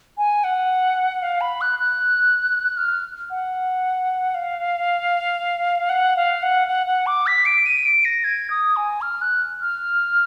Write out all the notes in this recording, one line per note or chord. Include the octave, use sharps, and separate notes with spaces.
G#5
F#5
F5
B5
F#6
F#6
F6
F#5
F5
F#5
F5
F#5
F#5
F#5
D6
B6
D7
D#7
D7
A#6
G#6
D#6
G#5
F6
F#6
F6